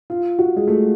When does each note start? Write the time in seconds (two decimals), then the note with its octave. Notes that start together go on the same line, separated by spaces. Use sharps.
0.10 F4
0.39 F#4
0.56 G#3
0.68 A3